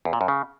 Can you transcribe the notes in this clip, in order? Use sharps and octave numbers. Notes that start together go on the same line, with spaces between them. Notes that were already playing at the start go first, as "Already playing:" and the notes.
E2
A#2
F#2
C#3